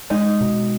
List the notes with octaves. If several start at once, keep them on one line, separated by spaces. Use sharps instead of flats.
G#3 D#4
B2